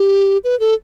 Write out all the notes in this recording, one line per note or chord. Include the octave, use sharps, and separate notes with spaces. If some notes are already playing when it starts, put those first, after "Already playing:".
Already playing: G4
B4
A4